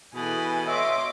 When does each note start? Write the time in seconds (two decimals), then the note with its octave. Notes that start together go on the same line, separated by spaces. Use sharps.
0.15 B2 E3 G#4 A4 B4 G#5
0.67 C#5 D#5 E5 C6 D6